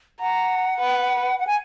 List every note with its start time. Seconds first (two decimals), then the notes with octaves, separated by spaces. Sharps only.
0.20 F#5 A#5
0.80 B4
1.39 F#5
1.47 G#5